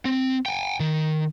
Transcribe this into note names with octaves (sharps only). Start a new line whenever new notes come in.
C4
G5 G#5
D#3